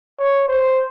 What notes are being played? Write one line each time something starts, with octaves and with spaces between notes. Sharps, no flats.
C#5
C5